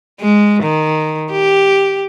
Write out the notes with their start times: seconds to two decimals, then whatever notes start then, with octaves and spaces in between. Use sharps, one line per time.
0.20 G#3
0.63 D#3
1.31 G4